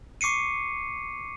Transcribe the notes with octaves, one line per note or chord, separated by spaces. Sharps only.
C#6 D6 C7 C#7 D#7